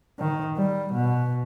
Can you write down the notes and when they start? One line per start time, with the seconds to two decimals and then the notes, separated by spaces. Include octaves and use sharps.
0.20 D#3
0.57 G3
0.93 B2